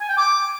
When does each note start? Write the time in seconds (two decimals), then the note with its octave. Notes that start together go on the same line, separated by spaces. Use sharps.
0.01 G#5
0.09 G5
0.17 D6